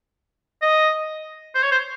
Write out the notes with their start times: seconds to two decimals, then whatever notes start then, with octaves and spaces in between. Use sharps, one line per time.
0.62 D#5
1.55 C5
1.63 C#5
1.72 C5